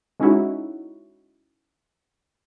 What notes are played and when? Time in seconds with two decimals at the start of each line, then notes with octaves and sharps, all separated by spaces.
0.20 G#3 C#4 D#4 E4 F#4